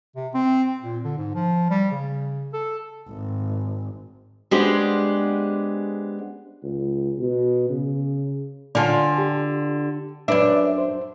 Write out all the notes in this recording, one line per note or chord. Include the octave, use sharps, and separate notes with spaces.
C3
C4
A#2
D3
G#2
F3
G3
C#3
A4
G#1
G#3 B3 D4 G4 G#4 C5
C#2
B2
C#3
D3 F4 D5 G#5 A5
G4
F#2 D4 B4 E5
C5